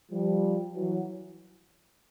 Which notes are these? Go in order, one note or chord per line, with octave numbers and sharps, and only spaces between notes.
F3 G3
E3 F#3